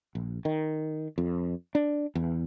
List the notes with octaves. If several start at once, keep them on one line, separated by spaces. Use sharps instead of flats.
A#1
D#3
F2
D4
E2